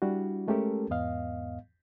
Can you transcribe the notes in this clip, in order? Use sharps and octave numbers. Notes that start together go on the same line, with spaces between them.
G3 D4 E4 F#4
G#3 A3 C#4 G4 A4 A#4
E2 G#2 B3 D#5 F5